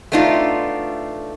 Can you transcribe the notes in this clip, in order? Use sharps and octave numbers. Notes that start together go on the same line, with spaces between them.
A3 B3 D4 D#4 F4